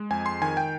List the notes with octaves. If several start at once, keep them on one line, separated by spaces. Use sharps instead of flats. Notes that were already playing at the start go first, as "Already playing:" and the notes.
Already playing: G#3
F2 G#5
C6
D#3 G#5
G5